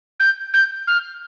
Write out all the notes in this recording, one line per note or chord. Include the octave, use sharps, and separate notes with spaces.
G6
G6
F6